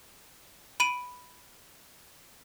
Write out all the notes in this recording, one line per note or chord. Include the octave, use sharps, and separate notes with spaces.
B5 D7 D#7